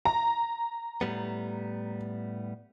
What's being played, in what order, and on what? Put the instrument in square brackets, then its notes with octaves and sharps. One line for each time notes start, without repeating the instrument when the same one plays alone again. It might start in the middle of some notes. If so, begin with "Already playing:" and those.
[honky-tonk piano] A#5
[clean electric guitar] A2 G3 B3